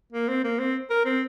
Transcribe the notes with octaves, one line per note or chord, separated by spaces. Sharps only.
A#3
C4
A#3
C4
A#4
C4